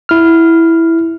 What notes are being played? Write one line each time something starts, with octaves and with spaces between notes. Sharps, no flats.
E4 F6